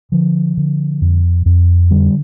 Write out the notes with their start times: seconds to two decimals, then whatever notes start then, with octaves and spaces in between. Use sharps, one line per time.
0.12 D3 F3
0.57 D3
1.02 F2
1.46 F2
1.90 D3 G3